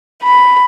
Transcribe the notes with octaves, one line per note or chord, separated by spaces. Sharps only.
B5